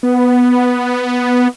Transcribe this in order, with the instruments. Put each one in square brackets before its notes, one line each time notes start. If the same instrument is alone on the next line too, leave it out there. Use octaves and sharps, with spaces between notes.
[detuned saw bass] B3